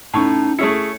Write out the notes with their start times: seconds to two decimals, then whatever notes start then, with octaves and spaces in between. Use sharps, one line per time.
0.14 A2 C#4 D#4 A5 C#6
0.59 A3 C#4 E4 G#4 C#7